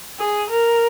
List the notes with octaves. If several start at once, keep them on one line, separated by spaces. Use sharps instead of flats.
G#4
A#4